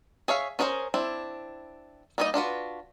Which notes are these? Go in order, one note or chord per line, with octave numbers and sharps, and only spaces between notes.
G#4 C#5 E5 F5
C#4 D4 G#4 A#4 C5
C4 D4 E4
G3 A#3 D#4 C#5 D#5
D4 F4 F#4 B4